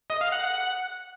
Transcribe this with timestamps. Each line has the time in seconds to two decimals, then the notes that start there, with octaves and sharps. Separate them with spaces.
0.10 D#5
0.21 F5
0.32 F#5
0.43 F#5